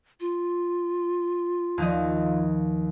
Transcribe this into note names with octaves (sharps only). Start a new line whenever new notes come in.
F4
D#2 F3 D#5